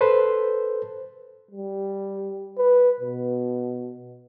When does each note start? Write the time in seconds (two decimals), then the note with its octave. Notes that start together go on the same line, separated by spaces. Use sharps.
0.01 A4 B4 C5
1.51 G3
2.58 B4
3.00 B2